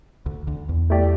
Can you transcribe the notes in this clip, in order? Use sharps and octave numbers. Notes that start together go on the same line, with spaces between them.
D2 D3
D2 D3
E2
A3 E4 G4 D5